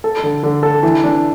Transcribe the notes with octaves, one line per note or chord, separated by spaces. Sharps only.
A4
D3
D3
A4
E3
D4